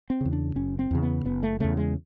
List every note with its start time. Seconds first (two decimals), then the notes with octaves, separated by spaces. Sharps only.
0.10 C4
0.21 E2 C#3
0.33 D4
0.56 F#1 C#4
0.79 C4
0.91 E2 C#3
1.03 B3
1.25 F#1 B3
1.43 A3
1.60 E2 C#3 A3
1.77 G#3